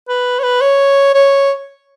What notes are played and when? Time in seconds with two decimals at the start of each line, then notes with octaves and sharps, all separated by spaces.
0.08 B4
0.39 C#5
0.44 B4
0.61 C#5
1.14 C#5